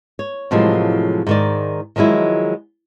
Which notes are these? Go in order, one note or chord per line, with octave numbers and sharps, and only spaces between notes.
C#5
A2 C3 F3 F#3 G#3 A#3
G#2 D#3 D5
D#3 F3 F#3 G#3 E4